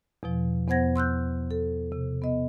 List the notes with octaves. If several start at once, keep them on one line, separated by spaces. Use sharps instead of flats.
E2 B2 F3
E2 B3 C5 F#5 G#6 A#6
C6 E6 F#6 G6
A4
C3
B3 D#5